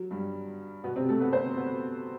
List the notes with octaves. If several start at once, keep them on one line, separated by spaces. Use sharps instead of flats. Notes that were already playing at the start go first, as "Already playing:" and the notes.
Already playing: F#3
G2 G3
B2 B3
C3 C4
A3 A4
B3 B4
C4 C5
B3 B4